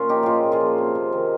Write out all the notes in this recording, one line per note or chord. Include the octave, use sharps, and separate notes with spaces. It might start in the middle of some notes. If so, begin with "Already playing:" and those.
Already playing: A#2 C#4 F4
F3 D#4 G4
A#2 F4 G4 G#4
A#2
F4 G#4
F3
C3
C3
D#3